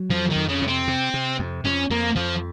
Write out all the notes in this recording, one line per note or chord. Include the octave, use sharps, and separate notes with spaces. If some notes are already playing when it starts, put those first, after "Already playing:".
Already playing: F#3
F2 F3
D#3
F2
C#3
C3
C4
C3
C3
F2
F2 C#4
F2 A#3
F2 F3